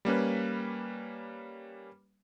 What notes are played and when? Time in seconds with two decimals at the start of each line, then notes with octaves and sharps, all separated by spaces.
0.05 G3 A#3 C#4 B4